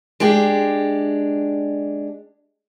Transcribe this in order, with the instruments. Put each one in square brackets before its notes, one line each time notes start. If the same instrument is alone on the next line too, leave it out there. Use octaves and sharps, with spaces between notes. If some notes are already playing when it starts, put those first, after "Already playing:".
[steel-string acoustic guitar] G#3 D4 G4